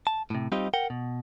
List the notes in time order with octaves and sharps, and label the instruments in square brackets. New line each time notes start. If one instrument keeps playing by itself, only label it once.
[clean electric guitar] A5
A2 C3
G3 C4 D#4 F4 G4 D#5
A#4 F#5 G5
B2